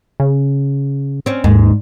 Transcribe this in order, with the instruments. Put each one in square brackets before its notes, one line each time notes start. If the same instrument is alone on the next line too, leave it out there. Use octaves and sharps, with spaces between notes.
[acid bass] C#3
[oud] C4 C#4
[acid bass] D#2 [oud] G#2